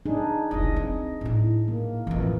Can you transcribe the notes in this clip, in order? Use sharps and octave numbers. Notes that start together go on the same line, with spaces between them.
D4 D#4 G#4
F1 C2 D#5
C4
A2 E4
A#3
A1 F2 E3